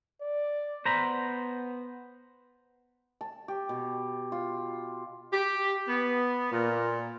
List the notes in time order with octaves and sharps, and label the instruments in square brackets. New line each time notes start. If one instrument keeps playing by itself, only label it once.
[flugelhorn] D5
[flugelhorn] B3 [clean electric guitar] C5 A#5 B5
[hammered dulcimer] A5
G4
B2
F4
[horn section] G4
B3
A#2